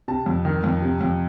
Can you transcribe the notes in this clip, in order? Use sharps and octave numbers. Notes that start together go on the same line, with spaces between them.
C3 A5
F2
D#3
F2
C3
F2